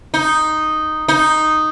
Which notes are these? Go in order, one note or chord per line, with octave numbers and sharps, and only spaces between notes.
D#4
D#4